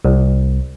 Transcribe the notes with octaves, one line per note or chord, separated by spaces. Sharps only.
C2